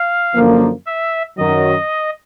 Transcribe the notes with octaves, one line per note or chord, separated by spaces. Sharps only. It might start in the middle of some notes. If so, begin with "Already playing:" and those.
Already playing: F5
F#2 D3 F3 A#3
E5
F#2 D#3 F#3 D#5